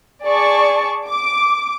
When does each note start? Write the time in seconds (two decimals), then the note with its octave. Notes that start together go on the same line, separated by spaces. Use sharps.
0.24 G#4 D5 A5 C#6
1.08 D6